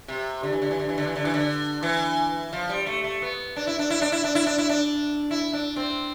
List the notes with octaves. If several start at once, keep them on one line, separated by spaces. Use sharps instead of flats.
C3
D3
E3
D3
E3
D3
E3
D3
E3
D3
E3
D3
E3
F3
G3
A3
A3
B3
D4
E4
D4
E4
D4
E4
D4
E4
D4
E4
D4
E4
D4
C4